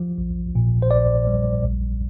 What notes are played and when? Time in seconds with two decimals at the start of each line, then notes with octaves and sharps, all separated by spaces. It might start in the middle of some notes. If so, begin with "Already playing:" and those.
Already playing: F3
0.18 A#1
0.55 A#2
0.82 C5
0.91 A#1 D5
1.27 G3
1.65 A#1